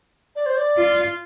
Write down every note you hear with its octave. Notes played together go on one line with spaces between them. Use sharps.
D5
C5
D5
F4